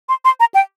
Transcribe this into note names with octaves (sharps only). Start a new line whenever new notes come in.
C6
C6
A#5
G5